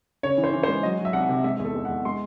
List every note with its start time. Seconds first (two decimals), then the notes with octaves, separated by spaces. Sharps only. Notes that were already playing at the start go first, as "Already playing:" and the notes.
0.23 C#3 C#5
0.38 E3
0.44 C5
0.53 E3
0.63 G#3 C5
0.83 F#3 D#5
0.99 F#3
1.05 E5
1.13 C2 F#5
1.29 C3
1.44 G#3 E5
1.60 E2 A4
1.75 G#3
1.85 E2 F#5
2.05 G#3 C6